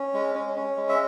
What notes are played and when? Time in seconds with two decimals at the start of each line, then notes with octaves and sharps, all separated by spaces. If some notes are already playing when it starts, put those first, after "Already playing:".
Already playing: C#4
0.14 G#3
0.35 C#4
0.56 C#4
0.77 G#3
0.89 E5